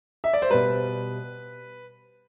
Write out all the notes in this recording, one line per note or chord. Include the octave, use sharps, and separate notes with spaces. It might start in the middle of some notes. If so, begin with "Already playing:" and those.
E5
D5
C5
B2 G3 B4